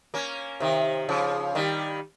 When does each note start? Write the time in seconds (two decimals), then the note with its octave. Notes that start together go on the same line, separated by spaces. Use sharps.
0.14 A#3 C#4
0.60 C3 D#3
1.09 C#3 F3
1.55 D#3 G3